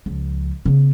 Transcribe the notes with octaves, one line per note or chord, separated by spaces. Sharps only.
C#2 F3
C#3 B3